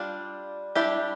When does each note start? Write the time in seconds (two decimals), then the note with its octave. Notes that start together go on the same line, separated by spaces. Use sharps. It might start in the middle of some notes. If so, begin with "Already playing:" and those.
Already playing: G3 D4 F4
0.75 G3 D4 E4 G4